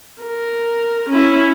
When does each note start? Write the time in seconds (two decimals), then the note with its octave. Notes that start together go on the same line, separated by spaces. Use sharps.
0.23 A#4
1.10 C#4 E4